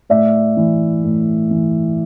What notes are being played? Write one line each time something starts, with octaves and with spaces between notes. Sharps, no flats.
A2 D5 E5
E3
A2
E3